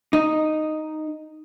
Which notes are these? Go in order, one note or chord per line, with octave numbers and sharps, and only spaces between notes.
D#4